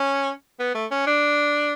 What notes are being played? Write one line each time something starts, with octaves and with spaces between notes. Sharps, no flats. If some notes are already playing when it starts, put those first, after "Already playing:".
Already playing: C#4
B3
A3
C#4
D4